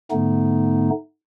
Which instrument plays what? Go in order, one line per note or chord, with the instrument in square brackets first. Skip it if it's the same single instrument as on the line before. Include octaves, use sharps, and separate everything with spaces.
[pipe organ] G#2 D3 A3 B3 D#4